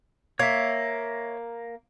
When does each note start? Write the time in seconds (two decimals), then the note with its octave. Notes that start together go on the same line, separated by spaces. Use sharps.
0.39 A#3 C#5 E5